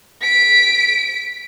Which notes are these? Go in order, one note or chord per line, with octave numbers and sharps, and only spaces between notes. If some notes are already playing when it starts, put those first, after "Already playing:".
B6 D7